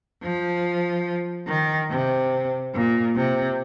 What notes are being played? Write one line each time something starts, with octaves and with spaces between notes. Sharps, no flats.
F3
D#3
C3
A#2
C3